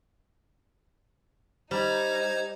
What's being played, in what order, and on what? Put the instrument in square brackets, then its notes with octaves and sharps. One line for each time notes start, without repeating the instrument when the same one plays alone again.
[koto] G3 [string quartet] D#4 [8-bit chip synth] C5 A#5 G#6